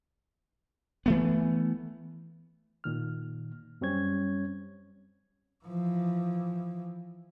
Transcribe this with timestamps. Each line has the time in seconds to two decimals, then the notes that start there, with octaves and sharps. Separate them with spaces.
1.06 E3 A3 B3
2.84 A#2 D#3 F6
3.81 F#2 G3 C4 C#4 C#5 G#6
5.64 E3 F3